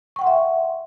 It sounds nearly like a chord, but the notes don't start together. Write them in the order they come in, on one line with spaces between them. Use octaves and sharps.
C#6 G5 F#5 C6 E5